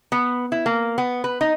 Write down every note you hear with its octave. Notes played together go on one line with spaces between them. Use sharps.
B3
E4
A#3
B3
B4
D#4